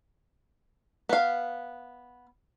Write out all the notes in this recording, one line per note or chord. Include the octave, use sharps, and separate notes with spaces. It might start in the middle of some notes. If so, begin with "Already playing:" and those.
B3 F5